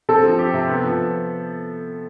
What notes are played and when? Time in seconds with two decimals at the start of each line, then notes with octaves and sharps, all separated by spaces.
0.09 C4 A4
0.23 F3
0.39 G4
0.54 C3
0.68 B3
0.84 F3